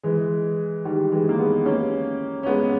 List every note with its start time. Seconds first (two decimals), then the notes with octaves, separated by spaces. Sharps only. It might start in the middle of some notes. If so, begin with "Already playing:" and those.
0.03 E3 G#3
0.85 D#3 G3
1.12 E3 G#3
1.29 A#3
1.39 G#3 B3
1.65 A#3 C#4
2.43 C#4
2.46 G#3 B3